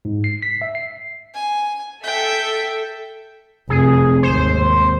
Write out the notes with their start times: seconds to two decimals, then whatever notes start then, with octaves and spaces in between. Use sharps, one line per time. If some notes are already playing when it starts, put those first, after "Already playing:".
0.05 G#2
0.24 C7
0.42 B6
0.61 E5
0.75 C7
1.35 G#5
2.04 A4 E5 G5
3.70 F1 G#4
4.23 G#1 D#2 C5